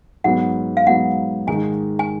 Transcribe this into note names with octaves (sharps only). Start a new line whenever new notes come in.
G#2 F#3 B3 F#5
F5
G#2 F#3 B3 F#5
G#2 D#3 G#3 D#4 G#5
G#5